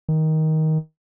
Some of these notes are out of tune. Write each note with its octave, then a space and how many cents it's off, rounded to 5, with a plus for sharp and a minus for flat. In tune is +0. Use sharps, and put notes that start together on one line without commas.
D#3 +15